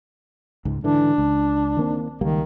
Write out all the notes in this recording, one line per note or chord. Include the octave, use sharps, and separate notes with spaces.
C#2 G#2
G#2 D3 E3 D4
C#2
D#3 A#3 C4
C#2 D#3 G3 A#3